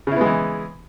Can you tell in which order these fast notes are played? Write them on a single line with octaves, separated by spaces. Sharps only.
C#3 E4 B3 G#3 E3